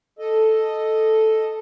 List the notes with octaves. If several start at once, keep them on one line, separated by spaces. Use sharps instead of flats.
A4 D#5